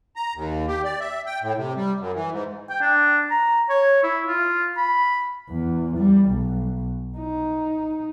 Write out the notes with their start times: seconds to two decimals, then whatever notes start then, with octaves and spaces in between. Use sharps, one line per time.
0.16 A#5
0.35 D#2
0.68 G4
0.84 D5
1.00 E5
1.26 G5
1.42 A2
1.57 C3
1.76 G3
1.99 F#2
2.15 E3
2.32 G#2
2.70 G5
2.81 D4
3.30 A#5
3.69 C#5
4.03 E4
4.27 F4
4.77 B5
5.50 E2
5.97 G3
6.29 B1
7.18 D#4